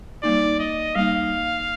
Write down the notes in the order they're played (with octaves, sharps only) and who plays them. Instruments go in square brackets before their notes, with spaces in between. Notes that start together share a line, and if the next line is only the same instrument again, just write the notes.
[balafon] G3 A#3 D#4 [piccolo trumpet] D5
[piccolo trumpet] D#5
[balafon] G3 A#3 D#4 [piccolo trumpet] F5